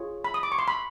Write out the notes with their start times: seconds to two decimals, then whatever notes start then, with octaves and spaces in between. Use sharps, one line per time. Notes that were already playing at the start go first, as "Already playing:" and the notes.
Already playing: F4 G#4 C#5
0.24 B5
0.34 D#6
0.43 D6
0.52 C#6
0.59 C6
0.68 B5